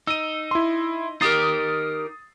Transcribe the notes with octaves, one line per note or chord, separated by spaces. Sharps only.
D#4 E6 D#7
E4 C6
D#4 G4 A#4 D#6 A6 C7